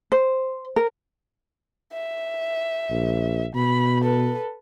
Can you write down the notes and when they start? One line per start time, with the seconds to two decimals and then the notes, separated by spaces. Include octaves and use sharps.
0.12 C5
0.76 A#4
1.93 E5
2.90 A#1
3.55 B2 B5
4.02 A4 B4